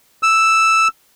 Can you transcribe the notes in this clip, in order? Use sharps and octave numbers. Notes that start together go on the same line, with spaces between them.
E6